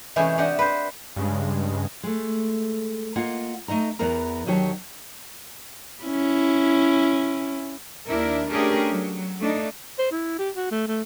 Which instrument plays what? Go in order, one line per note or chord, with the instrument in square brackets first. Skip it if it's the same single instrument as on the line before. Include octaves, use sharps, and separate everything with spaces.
[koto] C3 E3 G#3 A3 C#4 G4
C3 D4 G4 D#5 F#5
B4 C5
[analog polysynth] G2 C#3 G#3
[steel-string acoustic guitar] G#3 A3
A#3 F4 D#5 F#5
A3 D#4 D#5 A#5
E2 E3 B3 A#4 A#5
E2 D#3 F#3 G4 C#5 A5
[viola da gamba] C#4 E4
[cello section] D#2 D4 E4 A#4
A3 C#4 D4 G4 G#4 A#4
F#3
A3 D4 D#4
[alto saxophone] C5
E4
G4
F#4
A3
A3